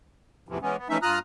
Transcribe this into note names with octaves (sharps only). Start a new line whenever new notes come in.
E2 A2 C3 E3 F3
E3 G#3 B3 C#4
B3
E3 F3 A3 C#4 D#4 E5
G2 F4 A#5 D#6 F6 F#6